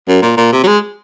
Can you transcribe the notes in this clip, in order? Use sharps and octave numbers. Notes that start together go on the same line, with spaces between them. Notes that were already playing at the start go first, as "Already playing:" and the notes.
F#2
A#2
A#2
C3
F#3
G#3